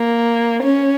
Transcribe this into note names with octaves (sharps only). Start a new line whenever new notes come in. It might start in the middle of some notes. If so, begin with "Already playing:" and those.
Already playing: A#3
C#4